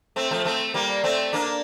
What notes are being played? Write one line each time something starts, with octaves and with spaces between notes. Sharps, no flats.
A3 C4
F3 A3
A3 C4
G3 A#3
A3 C4
A#3 D4